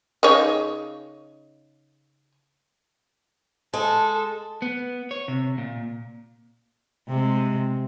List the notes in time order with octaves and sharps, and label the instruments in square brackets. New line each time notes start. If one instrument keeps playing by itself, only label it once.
[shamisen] C#3 D#4 C#5
[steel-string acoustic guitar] G#3 [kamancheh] A4
[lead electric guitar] B3
C#5
C3
A#2
[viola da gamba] C3 G#3